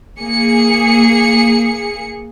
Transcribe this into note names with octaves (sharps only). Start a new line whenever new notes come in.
A#3 G#4 C#7